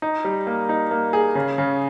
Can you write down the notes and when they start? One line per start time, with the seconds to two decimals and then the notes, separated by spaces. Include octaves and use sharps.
0.02 D#4
0.25 G3
0.47 A#3
0.69 D#4
0.91 A#3
1.13 G#4
1.35 C#3
1.58 C#3